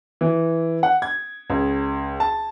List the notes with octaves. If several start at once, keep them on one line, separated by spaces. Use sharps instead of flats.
E3
F#5
G#6
C#2
A5